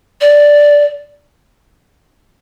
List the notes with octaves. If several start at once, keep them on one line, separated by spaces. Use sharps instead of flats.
D5